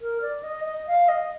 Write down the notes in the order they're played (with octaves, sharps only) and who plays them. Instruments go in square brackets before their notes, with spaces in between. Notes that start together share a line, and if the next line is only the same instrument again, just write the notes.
[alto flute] A#4
D5
D#5
D#5
F5
D#5